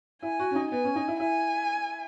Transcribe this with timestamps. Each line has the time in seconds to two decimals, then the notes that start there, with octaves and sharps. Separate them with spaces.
0.23 E4 G#5
0.39 F#4
0.51 C#4
0.55 D#4
0.71 B3 G#5
0.84 C#4
0.96 D#4
1.08 E4
1.20 E4 G#5